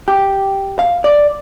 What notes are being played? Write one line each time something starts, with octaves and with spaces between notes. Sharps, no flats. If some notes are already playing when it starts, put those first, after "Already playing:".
G4
F5
D5